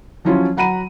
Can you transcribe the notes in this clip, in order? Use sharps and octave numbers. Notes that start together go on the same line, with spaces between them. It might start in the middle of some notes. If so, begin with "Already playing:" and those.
F3 F#3 C#4 E4 F4
F#3 F#5 A#5 B5 D#7